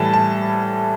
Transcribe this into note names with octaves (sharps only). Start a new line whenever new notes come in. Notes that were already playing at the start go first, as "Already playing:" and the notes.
Already playing: A2 E3 G3 A5
A5